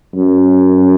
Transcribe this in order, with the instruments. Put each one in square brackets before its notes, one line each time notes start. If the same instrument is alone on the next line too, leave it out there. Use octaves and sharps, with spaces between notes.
[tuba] F#2